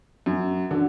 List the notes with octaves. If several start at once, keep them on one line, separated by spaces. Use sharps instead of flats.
F#2
D3 F#3